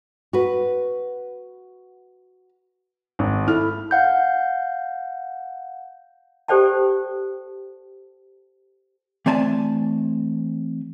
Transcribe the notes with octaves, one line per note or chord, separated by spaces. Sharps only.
F#4 B4
G#1
E4 A4 F6
F5 F#5 G6
G4 A4 C5 D5 G5 A5
E3 A3 C4 D5 G#5 A5